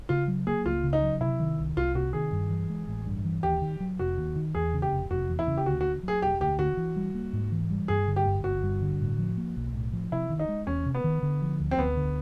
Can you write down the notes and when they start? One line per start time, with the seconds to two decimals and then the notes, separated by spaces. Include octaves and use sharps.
0.09 C#3 F4
0.28 F#3
0.47 A#3 G#4
0.65 C#2 F4
0.84 C#3
0.93 D#4
1.02 F#3
1.21 C3 E4
1.40 D#3
1.58 C2
1.76 C2 F4
1.95 C3 F#4
2.13 D#3 G#4
2.32 G2
2.51 E3
2.70 G#3
2.88 A1
3.06 G2
3.25 E3
3.43 D#2 G4
3.62 D#3
3.80 F#3
3.99 F1 F#4
4.18 D#2
4.36 D#3
4.55 E2 G#4
4.73 C#3
4.82 G4
4.92 F1
5.11 F1 F#4
5.29 E2
5.39 E4
5.47 C#3
5.57 G4
5.66 D2 F#4
5.81 D3 F#4
6.03 F#3 G#4
6.22 E1 G4
6.40 D2 G4
6.59 D3 F#4
6.77 E3
6.96 G3
7.15 A#3
7.33 G#2
7.52 E3
7.70 G3
7.88 G2 G#4
8.07 D3
8.16 G4
8.26 G1
8.44 G1 F#4
8.63 G2
8.82 D3
9.00 A2
9.19 F3
9.37 A#3
9.56 B1
9.74 A2
9.93 F3
10.12 C3 E4
10.30 D#3
10.39 D#4
10.49 G#3
10.67 E2 C#4
10.86 C3
10.95 B3
11.04 D#3
11.23 D3
11.42 F3
11.60 D2
11.71 C4
11.79 D2 B3
11.97 D3